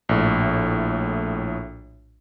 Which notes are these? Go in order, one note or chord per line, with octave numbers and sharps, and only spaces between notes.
A#1 A2